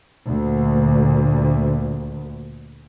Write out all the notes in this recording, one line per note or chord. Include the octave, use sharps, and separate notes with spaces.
D2 A#2